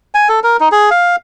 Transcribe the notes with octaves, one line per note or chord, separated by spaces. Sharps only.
G#5
A4
A#4
D#4
G#4
F5